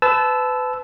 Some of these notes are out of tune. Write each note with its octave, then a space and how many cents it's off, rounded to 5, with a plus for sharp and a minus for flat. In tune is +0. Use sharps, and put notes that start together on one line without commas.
B4 +30 A5 -20 E6 +0